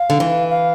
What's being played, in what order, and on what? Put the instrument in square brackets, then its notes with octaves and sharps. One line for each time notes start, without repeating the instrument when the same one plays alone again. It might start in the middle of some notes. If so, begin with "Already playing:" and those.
Already playing: [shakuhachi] F5
[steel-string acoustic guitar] D3
E3
[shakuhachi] F5